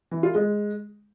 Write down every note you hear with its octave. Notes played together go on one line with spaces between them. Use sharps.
E3
F4
G#3